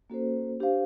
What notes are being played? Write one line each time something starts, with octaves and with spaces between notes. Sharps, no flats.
A#3 C#4 F#4 A4 C5
D4 G4 C5 F5